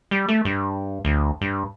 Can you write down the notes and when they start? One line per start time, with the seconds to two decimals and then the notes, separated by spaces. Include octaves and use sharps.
0.11 G3
0.29 A3
0.45 G2
1.05 D2
1.41 G2